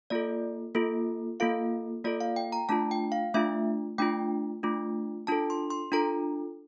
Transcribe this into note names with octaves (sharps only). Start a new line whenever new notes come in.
A#3 F4 A4 D5
A#3 F4 A4
A#3 F4 A4 F5
A#3 F4 A4 D5
F5
G5
A#5
A3 D4 F4 A5
G5
F5
A3 D4 F4 E5
A3 D4 F4 G5
A3 D4 F4
D4 F4 A4 A5
C6
C6
D4 F4 A4 A#5